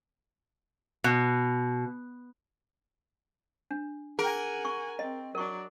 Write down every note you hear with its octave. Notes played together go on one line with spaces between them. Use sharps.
B2
D4
G#4 A#4 F#5 G#5
C#6
C4 D#5
F#3 D4 A#4 C#6